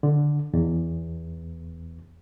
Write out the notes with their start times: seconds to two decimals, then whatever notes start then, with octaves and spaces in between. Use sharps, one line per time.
0.03 D3
0.54 E2